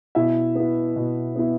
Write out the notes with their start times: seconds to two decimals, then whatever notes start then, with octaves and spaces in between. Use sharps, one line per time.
0.15 B2 E4 E5
0.55 B3 E4
0.96 B2
1.36 B3 E4